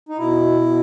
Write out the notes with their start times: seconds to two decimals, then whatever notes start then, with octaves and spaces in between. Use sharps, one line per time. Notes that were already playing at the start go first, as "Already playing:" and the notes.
0.09 D#4
0.18 B2 E4
0.66 B2